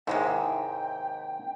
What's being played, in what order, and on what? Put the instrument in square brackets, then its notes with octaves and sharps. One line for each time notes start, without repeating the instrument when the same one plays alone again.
[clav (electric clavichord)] D#2 G#2 C3 [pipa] G#3 D#4 E4 [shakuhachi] G5